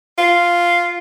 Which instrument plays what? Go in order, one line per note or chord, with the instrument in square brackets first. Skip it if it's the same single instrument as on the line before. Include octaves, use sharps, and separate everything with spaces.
[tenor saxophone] F4